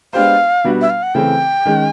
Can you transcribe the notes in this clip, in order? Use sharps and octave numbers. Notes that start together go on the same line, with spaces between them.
G#3 B3 D4 G4 C5 F5
B2 G3 B3 D4 F#4
E5
F5
F#5
C#3 E3 A3 C4 G5
D#3 G#3 C#4